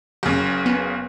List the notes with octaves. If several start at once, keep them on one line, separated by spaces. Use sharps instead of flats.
F#1 C#3
B3